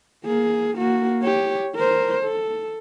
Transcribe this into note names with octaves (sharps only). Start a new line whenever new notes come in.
A#3 G#4
A#3 F#4
G4 C#5
A#4 C5
A4